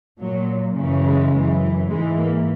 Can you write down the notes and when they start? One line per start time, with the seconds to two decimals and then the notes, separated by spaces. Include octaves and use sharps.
0.21 A#2 F#3
0.78 F#2 C#3 E3
1.05 G#3
1.33 F#2 E3
1.90 G#2 E3 G#3
2.18 A#3